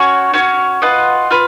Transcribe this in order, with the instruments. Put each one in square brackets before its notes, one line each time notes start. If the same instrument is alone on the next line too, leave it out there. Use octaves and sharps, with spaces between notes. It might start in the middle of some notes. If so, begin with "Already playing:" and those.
Already playing: [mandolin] C#4 F#4 C#5
C#4 F#4 C#5
F4 B4 D#5 F#5
F4 B4